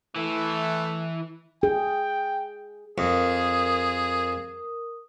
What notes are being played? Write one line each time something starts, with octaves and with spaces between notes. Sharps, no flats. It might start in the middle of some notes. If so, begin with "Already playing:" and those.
E3 A3
G#4 G5
F2 G#4 A#4 D#6